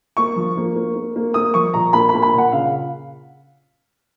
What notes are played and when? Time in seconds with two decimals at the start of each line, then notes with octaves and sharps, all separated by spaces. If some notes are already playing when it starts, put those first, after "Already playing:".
0.17 A#3 C#6
0.36 F3
0.57 A#3
0.76 A#3
0.96 A#3
1.16 A#3
1.34 A#3 D#6
1.54 F3 C#6
1.74 A#2 A#5
1.93 A#3 B5
2.09 B5
2.14 A#3
2.23 B5
2.34 A#2 F#5
2.52 C#3 F5